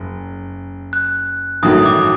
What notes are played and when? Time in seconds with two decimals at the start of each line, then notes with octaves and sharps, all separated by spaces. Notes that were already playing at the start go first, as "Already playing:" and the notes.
Already playing: F#1
0.93 F#6
1.63 A1 G2 D#3 F#3 A3 D#6
1.86 D6